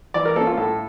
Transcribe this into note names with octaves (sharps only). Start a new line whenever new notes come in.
E3 D5
A#4
A#3 C#4 A4
F4
A2 A4